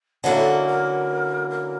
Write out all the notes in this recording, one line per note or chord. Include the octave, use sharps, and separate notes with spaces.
D3 F#3 A#3 C#4 E4 A4
A4
A#4
A#4
A#4